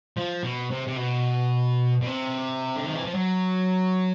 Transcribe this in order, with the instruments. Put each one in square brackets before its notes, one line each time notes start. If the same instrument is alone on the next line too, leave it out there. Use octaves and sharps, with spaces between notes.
[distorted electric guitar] F3
B2
C3
C3
B2
B2
C3
D3
D#3
E3
F3
F#3